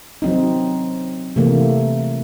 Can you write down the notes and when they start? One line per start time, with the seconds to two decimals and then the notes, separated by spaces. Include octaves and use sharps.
0.22 F#3 C4 D#4
1.36 C3 E3 A3 A#3